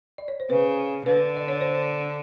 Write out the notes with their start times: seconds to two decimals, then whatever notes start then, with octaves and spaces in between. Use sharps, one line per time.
0.18 D5
0.28 C#5
0.40 C5
0.50 C#3 B4
1.05 D3 B4
1.37 D5
1.48 C#5
1.61 C5